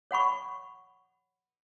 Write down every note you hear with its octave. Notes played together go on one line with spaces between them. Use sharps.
C#5 F#5 B5 C#6